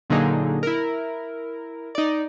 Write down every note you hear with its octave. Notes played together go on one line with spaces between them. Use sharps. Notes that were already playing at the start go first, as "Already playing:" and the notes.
A#2 D3 F#3 A#3 D#4 G#4
E4 A#4
D#4 D5